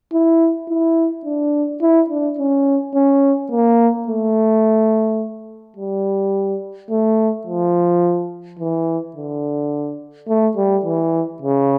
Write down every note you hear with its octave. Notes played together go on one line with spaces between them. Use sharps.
E4
E4
D4
E4
D4
C#4
C#4
A#3
A3
G3
A3
F3
E3
D3
A3
G3
E3
C#3